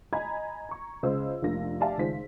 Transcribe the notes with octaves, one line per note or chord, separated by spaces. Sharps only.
D#5 G#5 A#5 B5 G#6
A#5 C#6
C#2 C#3 C5 D#5 E6
F1 A#3 D4 F4 A#4 A#6
G4 D5 E5 F5 G#5 A5
C#2 D#3 F4 C5 B6